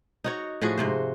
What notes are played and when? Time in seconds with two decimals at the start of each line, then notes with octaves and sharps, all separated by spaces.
0.24 D#4 F#4 C#5
0.61 A2 F3 F#4 G#4
0.78 G#2 C3 C5